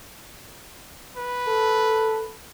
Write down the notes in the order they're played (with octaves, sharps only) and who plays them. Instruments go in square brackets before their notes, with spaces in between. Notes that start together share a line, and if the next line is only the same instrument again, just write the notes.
[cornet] B4
[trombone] A4